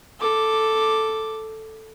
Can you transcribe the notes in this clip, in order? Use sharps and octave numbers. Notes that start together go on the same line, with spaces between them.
A4 D6